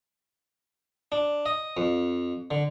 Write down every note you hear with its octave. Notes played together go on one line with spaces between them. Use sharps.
D4
D#5
F2
D3